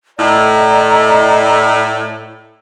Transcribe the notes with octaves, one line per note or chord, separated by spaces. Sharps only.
A2 D5 D#5 A#5